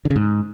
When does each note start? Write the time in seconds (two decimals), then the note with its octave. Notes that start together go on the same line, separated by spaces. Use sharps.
0.05 D3
0.10 C#3
0.16 G#2